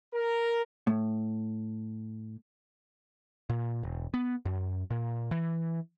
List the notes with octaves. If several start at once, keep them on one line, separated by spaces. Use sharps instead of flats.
A#4
A2
A#2
E1
B3
F#2
A#2
E3